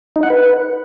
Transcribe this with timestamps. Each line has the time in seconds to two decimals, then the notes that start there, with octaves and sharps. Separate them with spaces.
0.16 D#4
0.23 F#5
0.30 B4